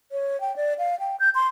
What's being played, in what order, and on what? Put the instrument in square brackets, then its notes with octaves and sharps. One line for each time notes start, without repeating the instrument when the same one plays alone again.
[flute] C#5
G5
D5
F5
G5
G6
C6